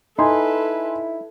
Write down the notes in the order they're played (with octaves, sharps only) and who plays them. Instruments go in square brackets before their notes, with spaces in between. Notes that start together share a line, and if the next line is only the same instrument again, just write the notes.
[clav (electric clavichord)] D#4 [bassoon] E4 [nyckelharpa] A4 B4 [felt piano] G#5 C6